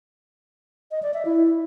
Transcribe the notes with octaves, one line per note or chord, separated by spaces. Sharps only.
D#5
D5
E5
E4